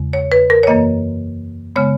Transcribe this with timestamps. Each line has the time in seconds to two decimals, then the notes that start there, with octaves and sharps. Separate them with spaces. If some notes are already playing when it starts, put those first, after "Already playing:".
Already playing: E2 C#3 G#3
0.13 C#5
0.32 B4
0.50 A#4
0.63 C#5
0.67 F#2 E3 A#3 D#5
1.76 C#3 G#3 B3 C#5